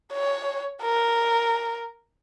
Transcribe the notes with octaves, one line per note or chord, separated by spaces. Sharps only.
C#5
A#4